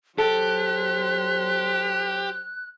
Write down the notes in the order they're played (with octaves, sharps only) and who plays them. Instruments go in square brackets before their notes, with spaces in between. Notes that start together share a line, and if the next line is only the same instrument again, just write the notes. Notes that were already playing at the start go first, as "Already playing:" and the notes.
[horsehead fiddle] F#3 C5 [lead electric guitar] G4 [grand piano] A4 [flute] F#6